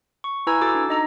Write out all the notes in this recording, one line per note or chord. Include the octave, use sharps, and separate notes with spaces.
C#6
E4 B4 G#5 A#5 E6 G#6
F#4 A4 D6 E6 A6
D4
D#4 D#5 A#5